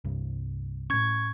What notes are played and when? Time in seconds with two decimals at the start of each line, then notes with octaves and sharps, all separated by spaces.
0.05 C2 G2
0.90 A2 C#4 C#6 G#6